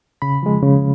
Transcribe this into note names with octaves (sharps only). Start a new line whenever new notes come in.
C#3 B5
F3 G#3
C#3